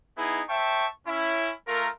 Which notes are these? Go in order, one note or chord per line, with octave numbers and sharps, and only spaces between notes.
B3 D#4 E4 G#4
C5 E5 G5 A5 C#6
C#4 E4
A3 F4 A#4